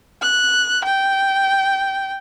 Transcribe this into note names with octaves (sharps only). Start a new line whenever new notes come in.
F#6
G5